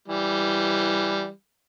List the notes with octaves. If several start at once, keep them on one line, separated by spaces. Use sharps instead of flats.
E3 G3